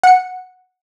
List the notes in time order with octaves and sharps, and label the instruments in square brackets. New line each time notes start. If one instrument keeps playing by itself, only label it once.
[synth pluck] F#5 C#7